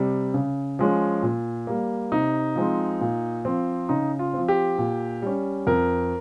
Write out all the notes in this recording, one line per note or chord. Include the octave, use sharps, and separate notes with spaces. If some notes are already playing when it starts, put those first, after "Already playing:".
Already playing: C3 G3
C#3
F3 G#3 C#4
A#2
G3 A#3
C3 D#4
F3 G#3 C4
A#2
F3 C4
C#3 D#4
F4
F3 C4
G4
A#2
G3 C#4
F2 A#4